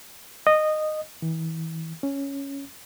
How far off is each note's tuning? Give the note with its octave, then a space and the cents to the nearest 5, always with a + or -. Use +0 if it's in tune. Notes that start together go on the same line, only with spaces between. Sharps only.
D#5 -15
E3 -30
C#4 +0